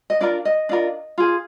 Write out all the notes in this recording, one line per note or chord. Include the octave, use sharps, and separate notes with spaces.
D#5
D4 F4 A#4 D5
D#5
D4 F4 A#4
F4 G#4